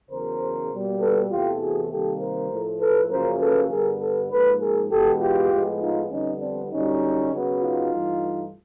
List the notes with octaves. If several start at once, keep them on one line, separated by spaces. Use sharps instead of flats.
E2 C#3 F#3 A#4 C5
B2 G3 A#3
A4 B4
E2 C3 E3 A3 F4 G4
F#4 G#4
C3 D#3 G3 A#3 G4 A4
A#4 C5
A2 F3 A3
A4 B4
F#2 C#3 F3 A#3 A#4 C5
A4 B4
G2 D3 G3 B3 G#4 A#4
A4 B4
G#2 F3 A#3 A4 B4
G#4 A#4
E2 B2 G#3 B3 G4 A4
F4 G4
A2 F3 G#3 B3
D#4 F4
F2 D3 G3 B3 C#4 D#4
C4 D4
F#2 D3 G3 C#4 D#4
C#3 F#3 B3
D#4 F4
G2 E3 A3